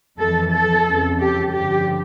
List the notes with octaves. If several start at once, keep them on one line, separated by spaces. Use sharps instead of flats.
F2 E3 A4
A4
F2 C#3 E3
G4
G2 D3 F3 G4